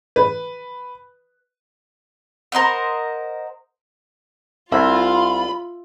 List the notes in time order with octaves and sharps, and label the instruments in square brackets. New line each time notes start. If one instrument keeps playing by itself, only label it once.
[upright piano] B4
[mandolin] A#4 C5 D#5 F#5
[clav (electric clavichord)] C2 [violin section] F4 [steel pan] E5 [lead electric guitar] B5